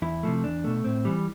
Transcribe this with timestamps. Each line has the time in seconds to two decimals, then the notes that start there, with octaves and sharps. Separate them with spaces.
0.02 E2 E4
0.23 C3 F3 A3
0.44 E2 D4
0.64 B2 A3
0.84 A2 C4
1.05 E3 G3